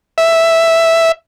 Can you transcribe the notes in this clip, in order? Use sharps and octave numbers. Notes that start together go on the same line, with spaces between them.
E5